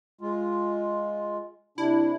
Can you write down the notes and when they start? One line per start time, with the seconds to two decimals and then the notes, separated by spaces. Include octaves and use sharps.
0.21 G#3 F4
1.78 C3 D4 E4